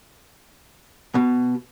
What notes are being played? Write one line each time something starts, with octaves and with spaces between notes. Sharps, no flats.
B2